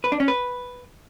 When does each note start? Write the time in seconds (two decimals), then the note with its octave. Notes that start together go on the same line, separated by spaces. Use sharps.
0.04 B4
0.12 D4
0.20 C#4
0.28 B4